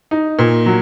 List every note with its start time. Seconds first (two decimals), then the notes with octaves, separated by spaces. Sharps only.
0.11 D#4
0.39 A#2
0.66 F#3